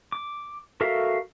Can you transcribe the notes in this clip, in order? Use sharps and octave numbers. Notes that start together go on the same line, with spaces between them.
D6
F#4 A4 A#4 E5 F5